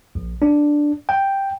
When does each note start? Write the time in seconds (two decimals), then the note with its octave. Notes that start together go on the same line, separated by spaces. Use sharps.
0.15 A#1
0.42 D4
1.09 G5